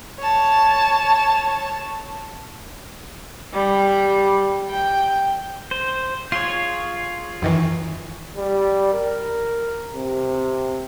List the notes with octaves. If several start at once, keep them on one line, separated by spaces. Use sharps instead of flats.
C#5 A5
G3
G5
C5
F4 G#4 C#5 C6
F#2 D#3 E3
G3
A#4
C3